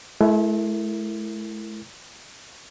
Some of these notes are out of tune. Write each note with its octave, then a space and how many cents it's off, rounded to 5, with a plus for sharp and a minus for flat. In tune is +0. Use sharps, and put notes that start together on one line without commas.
A3 -45 E4 +10 A#4 -20